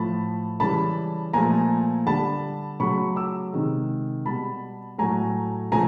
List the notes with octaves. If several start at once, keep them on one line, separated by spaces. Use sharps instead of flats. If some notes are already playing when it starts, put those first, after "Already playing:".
Already playing: A2 F3 A3 A5 B5
C#3 E3 G3 A5 B5
A#2 F3 A3 G#5 A#5
D3 G3 A5 B5
C#3 F#3 A3 B5 C#6
D6 E6
C3 D#3 G#3
B2 G3 A5 B5
A2 F#3 A3 G#5 A#5
C#3 F3 A3 G#5 A#5